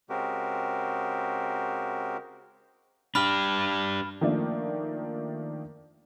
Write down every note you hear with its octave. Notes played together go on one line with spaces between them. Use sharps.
C#3 G#3 C4 F#4 G4 A#4
D4 G4 B5 F6
D#3 F3 A3 A#3 D4